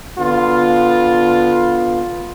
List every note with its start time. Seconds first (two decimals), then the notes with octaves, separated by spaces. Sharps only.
0.19 D3 B3 F4